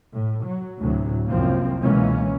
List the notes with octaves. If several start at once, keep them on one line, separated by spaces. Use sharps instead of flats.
A2
F#3
D2 A2 C3 F#3
C2 F#2 F3 A#3 C4
C#2 B2 E3 G#3 A#3 C#4